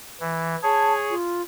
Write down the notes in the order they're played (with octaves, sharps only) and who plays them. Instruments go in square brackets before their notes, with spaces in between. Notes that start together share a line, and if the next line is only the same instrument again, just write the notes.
[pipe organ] E3
[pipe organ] G#4 C#5 [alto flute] A5
[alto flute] F4